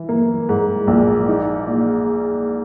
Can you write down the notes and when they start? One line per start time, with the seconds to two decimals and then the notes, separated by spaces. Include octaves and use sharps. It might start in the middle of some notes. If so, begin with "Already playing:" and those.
Already playing: E3
0.09 A#3
0.49 G#2
0.87 A#1
1.28 D#4
1.67 A#2